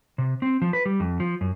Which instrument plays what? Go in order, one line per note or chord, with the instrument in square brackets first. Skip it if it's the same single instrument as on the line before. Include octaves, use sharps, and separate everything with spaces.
[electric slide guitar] C3
C4
F3
B4
G3
F2
F3
F#2